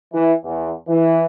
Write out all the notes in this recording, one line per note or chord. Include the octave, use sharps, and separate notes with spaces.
E3
E2
E3